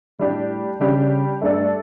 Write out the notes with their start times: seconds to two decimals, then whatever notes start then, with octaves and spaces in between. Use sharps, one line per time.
0.19 A2 G3 D4 G4
0.80 C#3 G3 D4 G4
1.41 G2 A3 D4 A4 D5